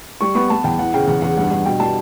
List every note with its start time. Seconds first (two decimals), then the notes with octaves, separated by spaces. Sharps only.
0.21 G3 C#6
0.35 B3 C#6
0.50 B3 A5
0.64 E2 G5
0.79 E3 F#5
0.94 C#3 G5
1.08 E2 F#5
1.22 E2 F#5
1.37 G2 F#5
1.51 G2 F#5
1.66 B2 G5
1.80 G3 A5